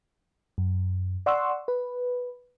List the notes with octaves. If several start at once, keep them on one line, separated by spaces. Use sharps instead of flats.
F#2
D5 F#5 C6 C#6 E6
B4